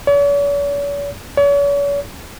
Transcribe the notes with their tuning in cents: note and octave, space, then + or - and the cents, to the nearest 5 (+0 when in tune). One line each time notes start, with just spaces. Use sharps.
C#5 +45
C#5 +40